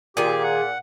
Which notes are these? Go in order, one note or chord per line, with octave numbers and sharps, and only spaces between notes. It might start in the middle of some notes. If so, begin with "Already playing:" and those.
A#2 D#3 G4 G#4
F#5